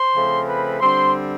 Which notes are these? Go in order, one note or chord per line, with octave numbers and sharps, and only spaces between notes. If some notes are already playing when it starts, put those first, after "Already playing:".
Already playing: C5 C6
C#3 F3 A3 C4
B4 B5
D3 G3 C4 C5 C6